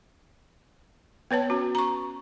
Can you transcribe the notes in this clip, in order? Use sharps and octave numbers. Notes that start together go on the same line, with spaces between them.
B3 B4 C#5 A5
C#4 F#4
A#5 C#6